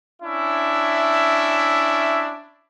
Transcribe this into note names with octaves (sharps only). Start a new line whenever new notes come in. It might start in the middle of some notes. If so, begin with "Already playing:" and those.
C#4 D4 E4 E5